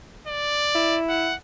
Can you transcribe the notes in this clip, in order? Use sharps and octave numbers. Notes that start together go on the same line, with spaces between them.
D5
E4
F#5